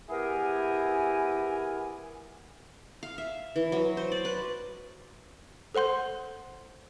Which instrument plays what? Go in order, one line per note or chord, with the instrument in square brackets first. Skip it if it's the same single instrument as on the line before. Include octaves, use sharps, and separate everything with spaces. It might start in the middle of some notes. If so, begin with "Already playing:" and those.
[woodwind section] B3 E4 G4 G#4 A#4 G#5
[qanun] F5
E5
E3
F#3
C5
D5
B4
[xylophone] A4 C5 F#5 C6 G6